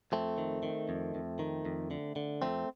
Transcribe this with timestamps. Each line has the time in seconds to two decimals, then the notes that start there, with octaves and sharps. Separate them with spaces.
0.12 F2 A3 C4
0.38 D#3
0.63 D#3
0.89 F2
1.15 F2
1.39 D#3
1.65 F2
1.91 D3
2.16 D3
2.42 F2 A3 C4